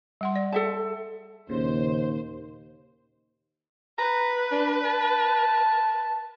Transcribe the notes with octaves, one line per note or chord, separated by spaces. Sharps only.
G3 F#5 C6
D5
A4 E5 A5
D#2 A#2 C#3 C5
B4 A#5
D4
A5